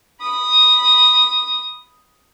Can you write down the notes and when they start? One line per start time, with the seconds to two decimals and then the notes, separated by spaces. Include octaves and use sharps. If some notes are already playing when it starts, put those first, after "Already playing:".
0.21 B5 D#6